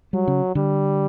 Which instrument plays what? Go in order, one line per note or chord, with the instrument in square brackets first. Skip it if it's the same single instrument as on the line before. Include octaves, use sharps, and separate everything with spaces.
[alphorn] F#3 [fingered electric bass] G3
[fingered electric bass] C#3
[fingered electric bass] D3 [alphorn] G3